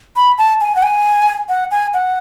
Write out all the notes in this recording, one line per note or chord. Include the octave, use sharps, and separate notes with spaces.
B5
A5
G#5
F#5
G#5
F#5
G#5
F#5